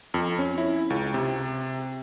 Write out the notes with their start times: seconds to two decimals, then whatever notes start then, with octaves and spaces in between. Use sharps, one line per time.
0.14 F2
0.39 C#4
0.58 E4
0.90 C#2
1.14 C3